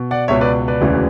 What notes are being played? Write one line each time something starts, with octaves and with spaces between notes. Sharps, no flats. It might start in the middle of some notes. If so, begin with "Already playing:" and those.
Already playing: B2
D5 F#5
C#2 B2 C#5 E5
B4 D5
B4 D5
E1 D2 C#3 E3